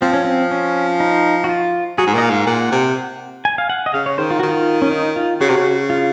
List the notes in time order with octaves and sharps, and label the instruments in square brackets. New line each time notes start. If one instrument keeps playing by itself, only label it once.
[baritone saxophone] F3 [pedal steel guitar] C4
[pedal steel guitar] C#4
C4
C#4
D#4
F#4
F4
[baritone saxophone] F#3 [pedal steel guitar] G#4
[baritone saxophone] G#2
[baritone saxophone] A#2 [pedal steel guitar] D#5
[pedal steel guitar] F5
[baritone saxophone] G#2
[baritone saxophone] A#2 [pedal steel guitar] F#5
[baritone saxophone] C3
[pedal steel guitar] G#5
F5
F#5
D#5
[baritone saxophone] C#3 [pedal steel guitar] F5
[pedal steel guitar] C#5
[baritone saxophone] D#3 [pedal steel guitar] C5
[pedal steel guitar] F4
[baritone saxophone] D#3 [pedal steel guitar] F#4
[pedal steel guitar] F4
C#4
D#4
F4
[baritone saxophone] C#3 [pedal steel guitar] F#4
[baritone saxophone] C3
C#3
[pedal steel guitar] F4